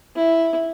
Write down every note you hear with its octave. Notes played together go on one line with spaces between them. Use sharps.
E4